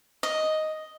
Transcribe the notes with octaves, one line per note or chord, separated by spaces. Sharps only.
D#5